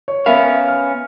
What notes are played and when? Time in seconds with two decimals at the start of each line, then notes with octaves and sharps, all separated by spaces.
0.08 C#5
0.26 B3 C#4 A#4 E5 F5 B5
0.68 F6